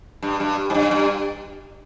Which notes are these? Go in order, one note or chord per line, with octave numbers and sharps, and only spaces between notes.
G2
G2
G#2
G2
G2